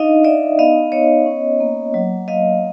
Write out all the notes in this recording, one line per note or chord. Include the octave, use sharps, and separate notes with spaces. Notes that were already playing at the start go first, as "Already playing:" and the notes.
Already playing: D4 D#4 D#5 F5
D#4 D5 E5
B3 D#5 F5
B3 C#5 D#5
C#4
A#3
F#3
F#3 D#5 F5